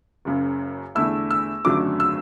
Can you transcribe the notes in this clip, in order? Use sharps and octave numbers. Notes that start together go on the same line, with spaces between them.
F#1 F#2 C#3
E2 D3 A3 E4 E6
E6
G#1 F#2 D3 F#3 A3 D6
E6